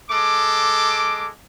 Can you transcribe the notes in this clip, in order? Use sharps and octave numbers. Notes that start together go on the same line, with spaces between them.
G#3 A4 D6